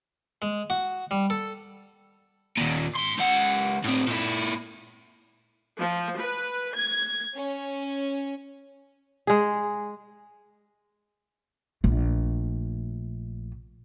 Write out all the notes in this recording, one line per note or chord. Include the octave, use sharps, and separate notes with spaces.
G#3
F#4
G3
A4
D#2 A#2
G#2 C6
C#2 F#5
A2 C4
A#2 E4
F3
B4
G#6
C#4
G#3 G#4
A#1 A3